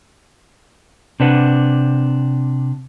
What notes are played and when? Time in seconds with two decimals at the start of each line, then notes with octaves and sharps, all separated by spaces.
1.20 C3 D4 B4 F#5